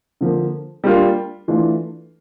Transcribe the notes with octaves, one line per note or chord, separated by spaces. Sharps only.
D3 F3 A#3
G3 A#3 D4 F4
E3 A3 D4 F4